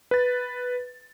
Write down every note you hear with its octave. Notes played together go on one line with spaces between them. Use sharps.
B4 A6